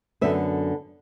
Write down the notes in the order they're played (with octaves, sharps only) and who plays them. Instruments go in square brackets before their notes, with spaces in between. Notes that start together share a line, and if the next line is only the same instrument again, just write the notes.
[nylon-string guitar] F#2 D3 B3 E5